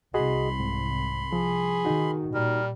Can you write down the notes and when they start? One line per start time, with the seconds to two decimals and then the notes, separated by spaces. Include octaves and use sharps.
0.14 C2 F#4 G#4 D#5 B5 C6
0.60 G#2
1.32 F3 G#4
1.85 D#3 D#4 F#4
2.34 A#2 G3 A#4